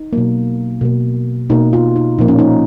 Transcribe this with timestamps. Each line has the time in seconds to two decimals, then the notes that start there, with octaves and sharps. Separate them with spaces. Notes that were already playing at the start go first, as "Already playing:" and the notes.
Already playing: D#4
0.13 B2 F#3 A#3
0.81 B2 A#3
1.50 B2 A#3 D#4
1.73 F4
1.96 D#4
2.18 A#2 F3 A#3 D#4
2.28 C#4
2.39 D#4